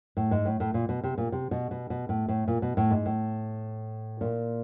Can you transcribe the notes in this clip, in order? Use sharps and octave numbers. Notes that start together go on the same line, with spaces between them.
A2
G#2
A2
A2
A#2
B2
C3
A#2
C3
B2
B2
B2
A2
A2
A#2
B2
A2
G#2
A2
A#2